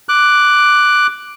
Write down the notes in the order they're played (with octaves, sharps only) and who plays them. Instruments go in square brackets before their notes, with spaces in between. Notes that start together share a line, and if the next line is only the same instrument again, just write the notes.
[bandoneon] D6 F#6